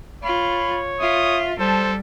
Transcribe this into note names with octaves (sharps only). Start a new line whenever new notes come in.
F4 C#5 B5
F4 E5 D#6
G3 A4 C5 A5